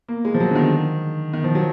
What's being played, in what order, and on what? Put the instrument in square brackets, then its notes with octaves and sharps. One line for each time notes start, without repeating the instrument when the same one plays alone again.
[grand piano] A#3
G#3
F3
F#3
D3
D#3
D#3
F3
F#3